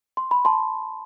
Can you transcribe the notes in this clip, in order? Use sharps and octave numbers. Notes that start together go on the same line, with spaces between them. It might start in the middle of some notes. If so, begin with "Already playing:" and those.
C6
B5
A5 C6